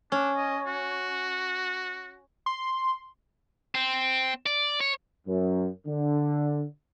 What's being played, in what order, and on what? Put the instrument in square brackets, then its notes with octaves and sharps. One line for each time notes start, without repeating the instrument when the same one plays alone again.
[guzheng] C#4 [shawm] D4
[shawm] D#5
F#4
[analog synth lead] C6
[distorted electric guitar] C4
D5
C#5
[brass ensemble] F#2
D3